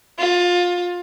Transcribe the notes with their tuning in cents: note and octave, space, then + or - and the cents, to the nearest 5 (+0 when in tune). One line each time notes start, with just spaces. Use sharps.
F4 +20